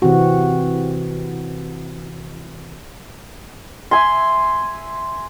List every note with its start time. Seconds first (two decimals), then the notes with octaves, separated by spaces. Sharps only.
0.02 C3 E3 C4 F#4
3.91 E5 G#5 C6